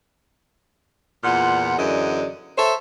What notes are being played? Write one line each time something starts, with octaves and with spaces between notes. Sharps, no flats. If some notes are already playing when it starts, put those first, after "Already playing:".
E2 A#2 F4 F#5
F#2 D3 E3 G#4 D5 D#5
A4 C5 C#5 E5